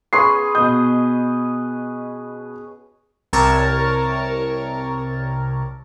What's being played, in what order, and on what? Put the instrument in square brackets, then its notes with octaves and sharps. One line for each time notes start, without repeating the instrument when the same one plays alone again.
[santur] C#4 G#4 B4 [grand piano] C6 C#6 C7
[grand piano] B2 G6 [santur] D#5
[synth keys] C2 C3 A#4 C#5 A5 C#6